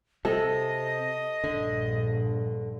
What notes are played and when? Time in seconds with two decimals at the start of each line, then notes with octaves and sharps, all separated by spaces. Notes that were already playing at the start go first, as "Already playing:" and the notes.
0.25 C3 A4 D#5
1.44 A#1 G2 D3